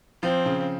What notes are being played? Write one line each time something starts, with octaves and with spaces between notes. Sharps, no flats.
F3 C4
C#3